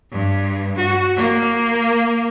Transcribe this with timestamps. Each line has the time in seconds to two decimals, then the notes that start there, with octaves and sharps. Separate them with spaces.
0.11 G2
0.77 F#4
1.17 A#3